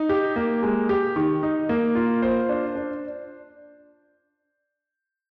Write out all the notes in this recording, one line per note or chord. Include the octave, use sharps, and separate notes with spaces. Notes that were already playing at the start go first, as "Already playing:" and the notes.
Already playing: D#4
G4
A#3
G#3
G4
D#3
D#4
A#3
F4
C5
D4
D4